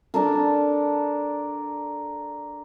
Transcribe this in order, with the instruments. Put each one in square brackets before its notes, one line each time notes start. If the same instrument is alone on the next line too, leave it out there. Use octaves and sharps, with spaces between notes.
[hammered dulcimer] D4 A4 A#4